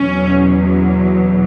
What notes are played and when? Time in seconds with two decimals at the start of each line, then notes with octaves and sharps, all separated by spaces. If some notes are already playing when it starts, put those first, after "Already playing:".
Already playing: E2 B2 F#3 C#4